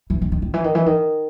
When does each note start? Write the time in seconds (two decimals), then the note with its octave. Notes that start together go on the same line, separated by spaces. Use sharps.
0.10 E3
0.22 D#3
0.32 D#3
0.42 D#3
0.54 E3
0.64 D#3
0.75 E3
0.86 D#3